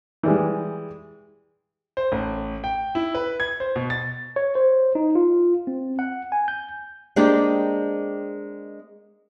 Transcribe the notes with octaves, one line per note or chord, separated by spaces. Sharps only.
E3 G3 G#3
C5
A1
G5
E4
B4
G#6
C5
B2
A6
C#5
C5
D#4
F4
C4
F#5
G#5
G6
G#3 A#3 C4 D4 G4